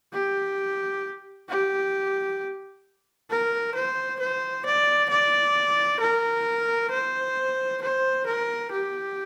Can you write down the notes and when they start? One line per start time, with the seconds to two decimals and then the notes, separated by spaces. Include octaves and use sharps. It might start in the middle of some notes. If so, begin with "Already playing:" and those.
0.13 G4
1.49 G4
3.30 A#4
3.75 C5
4.20 C5
4.66 D5
5.10 D5
6.00 A#4
6.91 C5
7.82 C5
8.26 A#4
8.72 G4